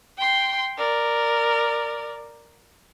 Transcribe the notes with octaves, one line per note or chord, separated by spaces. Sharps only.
G5 C6
A#4 D5